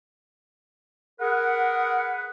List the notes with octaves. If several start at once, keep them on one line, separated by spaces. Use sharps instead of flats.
G#4 A#4 B4 F#5